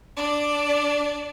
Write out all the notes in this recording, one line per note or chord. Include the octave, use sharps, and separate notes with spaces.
D4 D5